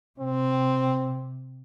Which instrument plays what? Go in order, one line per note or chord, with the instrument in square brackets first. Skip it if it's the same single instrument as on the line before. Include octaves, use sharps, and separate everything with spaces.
[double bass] C3 [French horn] C4